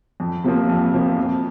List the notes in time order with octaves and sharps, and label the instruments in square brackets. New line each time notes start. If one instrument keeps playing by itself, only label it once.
[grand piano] F2
C3 F3 A#3
F2
C3 F3 A#3
F2